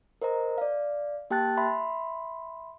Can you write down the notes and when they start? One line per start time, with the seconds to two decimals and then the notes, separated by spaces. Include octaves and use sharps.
0.22 A#4 C5 D#5 A#5
0.58 D5 F5
1.30 A#3 G4 G5 A5 F#6 A6
1.57 E5 B5 C6